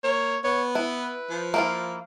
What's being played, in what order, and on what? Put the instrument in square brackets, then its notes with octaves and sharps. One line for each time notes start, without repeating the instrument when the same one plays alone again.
[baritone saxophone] A#3 [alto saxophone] C#5
[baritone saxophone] B3 [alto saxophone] C#5
[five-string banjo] E4 [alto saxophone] B4
[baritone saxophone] F3
[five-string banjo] A#3 E4 F4